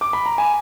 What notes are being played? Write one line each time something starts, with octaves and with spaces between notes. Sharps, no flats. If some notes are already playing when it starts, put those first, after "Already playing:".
D6
B5
A#5
G#5